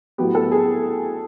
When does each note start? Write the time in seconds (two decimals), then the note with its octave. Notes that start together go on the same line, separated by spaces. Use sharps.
0.18 A2 F#3 B3 G4
0.35 A4
0.52 G#4